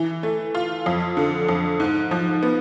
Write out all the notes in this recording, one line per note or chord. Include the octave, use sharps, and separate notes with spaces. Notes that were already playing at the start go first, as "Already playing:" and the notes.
Already playing: E3
A3
F4
F2
D3
F2
G#2
F3
B3